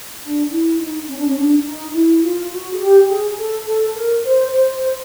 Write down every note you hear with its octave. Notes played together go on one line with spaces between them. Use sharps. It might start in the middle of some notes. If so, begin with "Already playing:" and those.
D4
E4
D#4
C#4
D4
C#4
D4
D#4
E4
F4
F#4
G#4
G4
G#4
A4
A4
A#4
C5
C5
C5